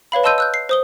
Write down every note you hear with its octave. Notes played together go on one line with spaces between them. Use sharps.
B4 C#5 F5 B5
D#5 A5 C6 E6 G6 D#7
E6 F#6 G6
C7
C5 D#6 G7